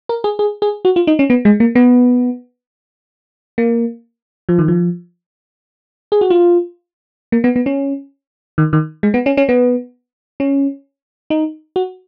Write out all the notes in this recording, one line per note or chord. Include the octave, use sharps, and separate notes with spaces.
A#4
G#4
G#4
G#4
F#4
F4
D#4
C#4
B3
G#3
A#3
B3
A#3
F3
D#3
F3
G#4
F#4
F4
A#3
B3
B3
C#4
D#3
D#3
G#3
B3
C#4
C#4
B3
C#4
D#4
F#4